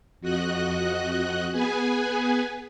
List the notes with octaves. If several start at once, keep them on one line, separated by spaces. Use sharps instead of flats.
F2 F#4 D#5 F#6
B3 G#4 B4 G#5